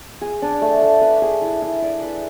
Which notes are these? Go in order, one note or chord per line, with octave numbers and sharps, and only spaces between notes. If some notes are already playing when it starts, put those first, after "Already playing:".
G#4
D4
A3
A3
B4
G#4
E4
E4
D5
B4